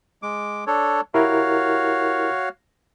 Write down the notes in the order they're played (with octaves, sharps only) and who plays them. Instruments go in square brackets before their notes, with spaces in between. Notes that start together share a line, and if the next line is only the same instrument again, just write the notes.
[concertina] G#3 D6
D4 A4 C#5
[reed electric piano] E4 G4 A#4 [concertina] F#4 C#5 F5